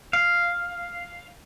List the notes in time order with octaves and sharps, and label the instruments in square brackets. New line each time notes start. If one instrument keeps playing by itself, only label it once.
[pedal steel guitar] F5